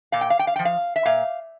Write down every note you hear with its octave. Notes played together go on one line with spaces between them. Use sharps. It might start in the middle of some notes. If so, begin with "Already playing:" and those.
A#2 F5
G5
F5
G5
F5
F3 G5
F5
E5
A#2 F5